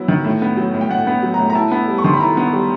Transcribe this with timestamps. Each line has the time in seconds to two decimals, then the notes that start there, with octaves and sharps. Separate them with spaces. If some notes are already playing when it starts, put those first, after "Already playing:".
Already playing: F#3 B3 E4
0.08 D#3
0.25 A2
0.42 B3
0.57 F#3
0.74 A2
0.81 G5
0.89 A2 F#5
1.07 B3
1.23 F#3
1.34 A#5
1.39 A2
1.50 A#5
1.55 E4 A5
1.71 B3
1.88 G3
1.98 C#6
2.04 D#3 C6
2.14 B5
2.20 E4 A#5
2.37 B3
2.53 G3